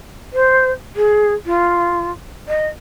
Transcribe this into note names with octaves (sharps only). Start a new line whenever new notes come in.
C5
G#4
F4
D#5